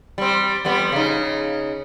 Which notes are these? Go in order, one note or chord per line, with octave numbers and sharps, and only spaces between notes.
G3 C4
F2 G3 B3
C#3 D#4